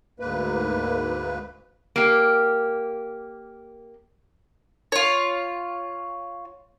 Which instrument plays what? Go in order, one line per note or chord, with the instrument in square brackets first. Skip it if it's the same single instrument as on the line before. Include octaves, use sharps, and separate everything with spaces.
[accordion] D2 G#2 A#3 B4
[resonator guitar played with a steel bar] A#3 G4
[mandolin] F4 C#5